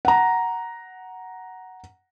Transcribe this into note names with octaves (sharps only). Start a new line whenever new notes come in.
F#5 A#5